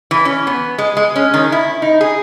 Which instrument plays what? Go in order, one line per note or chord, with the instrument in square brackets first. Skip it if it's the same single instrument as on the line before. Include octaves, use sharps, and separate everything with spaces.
[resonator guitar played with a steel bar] E3
C#4
B3
G#3
G#3
C#4
D#3
E4
D#4
G#4